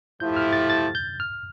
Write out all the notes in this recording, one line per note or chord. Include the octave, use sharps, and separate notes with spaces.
F3 A3 E4 G4 G6
F6
A6
A6
G6
F6